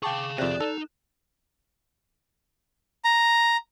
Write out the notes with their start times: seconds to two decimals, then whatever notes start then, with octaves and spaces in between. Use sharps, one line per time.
0.03 G#4 F5 G5 A5 C#6 D6
0.38 F2 C3 D5 F#6 E7
0.60 D#4 A4
3.04 A#5